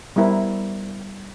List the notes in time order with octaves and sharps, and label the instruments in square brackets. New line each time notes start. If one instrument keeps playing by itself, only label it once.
[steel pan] G3 B3 E4 A#4 C5